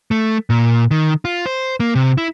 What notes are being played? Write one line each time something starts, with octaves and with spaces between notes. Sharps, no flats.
A3
A#2
D#3
F4
C5
A#3
C3
E4